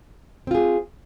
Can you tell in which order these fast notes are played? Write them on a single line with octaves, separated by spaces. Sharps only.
C4 F4 G#4